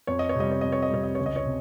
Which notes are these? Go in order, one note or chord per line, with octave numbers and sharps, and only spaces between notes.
F2 C#5
D#5
C#5
C3 G3 D#5
C#5
F2 D#5
C#5
D#5
C3 G3 C#5
D#5
C#2 C#5
D#5
C#5
C3